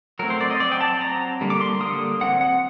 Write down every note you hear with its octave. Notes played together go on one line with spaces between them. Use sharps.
F#3 A3 C4 A#4
C5
D5
D#5
F#3 C4 D5
G5
A5
F#3 C4 A#5
D3 G3 A#3
D6
C6
D3 G3 A#3 D#6
F#3 C4 F#5
F#5